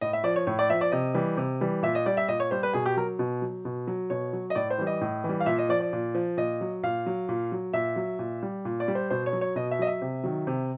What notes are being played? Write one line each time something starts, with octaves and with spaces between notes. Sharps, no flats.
A2 D#5
E5
F3 D5
C#5
A2 C#5
D5
F3 E5
D5
C3 D#5
E3 G3
C3
E3 G3
A#2 E5
D#5
G3 D5
E5
A#2 D#5
C#5
G3 C5
B4
B2 G#4
G4
F#3 A#4
B2
F#3
B2
F#3
B2 C#5
F#3
D#5
A2 D5
C5
E3 G3
D#5
A2
E3
G3
F5
A#2 E5
D#5
F3 D5
D5
A#2
F3
A#2 D#5
F#3
A#2 F5
F#3
A#2
F#3
A#2 E5
F#3
A#2
G3
A#2
D5
G3
C5
B2 C5
C#5
F#3
C#5
B2 D#5
E5
F#3 D#5
E5
C3
D#3 F#3
C3